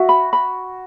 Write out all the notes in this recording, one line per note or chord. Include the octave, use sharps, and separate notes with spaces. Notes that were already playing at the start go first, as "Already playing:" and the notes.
Already playing: F#4 E5
B5
B5